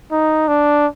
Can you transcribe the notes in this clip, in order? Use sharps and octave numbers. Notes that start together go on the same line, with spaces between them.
D#4
D4